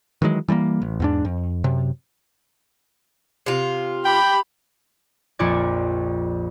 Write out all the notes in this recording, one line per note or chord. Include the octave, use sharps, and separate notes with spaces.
D#3 E3 F#3 G#3
E3 G3 G#3 A#3
A1
E2 G#2 D4
F2
F#2 C3
C3 F4
G4 G5 B5
A#1 F2 F4 D5 C#6 G#6